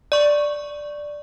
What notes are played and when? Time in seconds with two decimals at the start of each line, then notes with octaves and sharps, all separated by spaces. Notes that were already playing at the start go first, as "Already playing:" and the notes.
0.12 D5 C#6